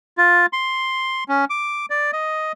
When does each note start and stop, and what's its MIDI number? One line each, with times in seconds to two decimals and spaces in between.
0.18 0.46 65
0.53 1.24 84
1.28 1.45 61
1.50 1.86 86
1.90 2.11 74
2.13 2.52 75